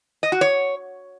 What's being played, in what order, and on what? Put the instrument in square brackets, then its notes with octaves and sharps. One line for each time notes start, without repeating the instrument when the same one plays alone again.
[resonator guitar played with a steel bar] D#5
F#4
C#5